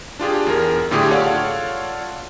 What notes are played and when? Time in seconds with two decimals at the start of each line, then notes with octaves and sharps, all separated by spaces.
0.19 D4 F4 G4 G#4
0.47 E2 G#4 A#4
0.91 A2 D3 A3 G4 G#4
1.10 F4 A4 C#5 D5 F5 F#5